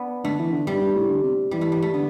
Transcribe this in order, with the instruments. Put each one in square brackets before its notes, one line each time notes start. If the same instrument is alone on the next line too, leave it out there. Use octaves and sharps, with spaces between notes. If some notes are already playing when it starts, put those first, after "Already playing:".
Already playing: [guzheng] B3 D4
[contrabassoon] D3 [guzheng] A3
[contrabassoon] E3
D3
[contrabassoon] G2 [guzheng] G3
[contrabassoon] G2
A2
D3
C3
[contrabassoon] E3 [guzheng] G3
[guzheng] A3
G3
A3
[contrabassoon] D3 [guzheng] B3